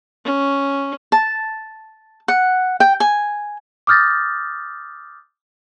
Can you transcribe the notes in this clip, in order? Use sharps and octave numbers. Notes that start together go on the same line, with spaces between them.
C#4
A5
F#5
G5
G#5
D6 D#6 F6 G6 A6 A#6